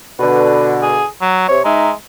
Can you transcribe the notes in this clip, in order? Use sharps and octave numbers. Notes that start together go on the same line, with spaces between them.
B2 D3 B4
G#4
F#3
C3 C#5
G#3 D#4 E5 A#5